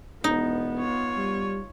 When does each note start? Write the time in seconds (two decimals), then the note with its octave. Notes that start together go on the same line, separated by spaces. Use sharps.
0.24 E1 B3 D#4
0.79 F4 C#5
1.17 G3